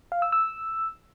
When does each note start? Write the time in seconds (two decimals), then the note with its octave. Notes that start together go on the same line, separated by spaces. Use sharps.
0.12 F5
0.22 E6
0.32 E6